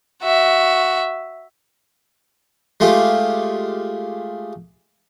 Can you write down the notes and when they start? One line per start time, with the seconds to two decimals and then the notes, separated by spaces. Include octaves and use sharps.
0.22 F#4 E5
2.80 G#3 A3 F4 G4